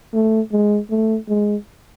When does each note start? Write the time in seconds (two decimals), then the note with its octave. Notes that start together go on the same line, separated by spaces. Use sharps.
0.14 A3
0.52 G#3
0.90 A3
1.29 G#3